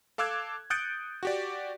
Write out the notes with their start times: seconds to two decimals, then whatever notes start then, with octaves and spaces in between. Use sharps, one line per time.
0.18 A4 F5 D6 E6 F#6 G#6
0.70 D#6 F#6 G6 A6 C#7 D7
1.23 F#4 G4 D5